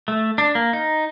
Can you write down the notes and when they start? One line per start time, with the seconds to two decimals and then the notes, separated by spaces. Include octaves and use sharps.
0.08 A3
0.38 D4
0.55 A#3
0.73 D#4